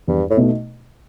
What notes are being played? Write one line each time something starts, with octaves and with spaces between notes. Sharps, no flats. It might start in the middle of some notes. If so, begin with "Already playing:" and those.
E2 G2
A2
B2 A3 D#4